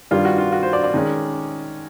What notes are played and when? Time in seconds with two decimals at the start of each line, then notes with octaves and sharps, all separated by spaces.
0.11 G2 D#3 G3 F4
0.25 F#4
0.38 F4
0.53 F#4
0.63 C5
0.73 D5
0.83 D5
0.94 D#3 G#3 C#4